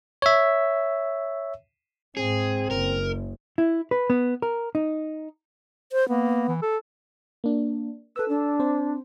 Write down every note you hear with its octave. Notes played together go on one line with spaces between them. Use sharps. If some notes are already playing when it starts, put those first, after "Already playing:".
C#5 E5
G#2 C4 G#4
F#1 A#4
E4
B4
B3
A#4
D#4
C5
A#3 B3
E3
A4
A#3 D4
A4 B4 E6
D4
C4 C5